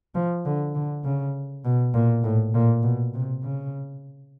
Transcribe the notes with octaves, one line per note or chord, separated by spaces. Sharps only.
F3
D3
D3
C#3
B2
A#2
A2
A#2
B2
C3
C#3